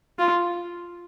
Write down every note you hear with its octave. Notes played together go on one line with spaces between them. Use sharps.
F4